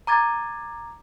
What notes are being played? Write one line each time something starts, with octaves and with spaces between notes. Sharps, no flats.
A#5 D6 G#6 A6